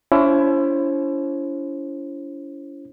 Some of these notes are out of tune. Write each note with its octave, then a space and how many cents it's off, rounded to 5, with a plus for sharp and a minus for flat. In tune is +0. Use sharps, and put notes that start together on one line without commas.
C#4 +45 E4 +30 C5 +35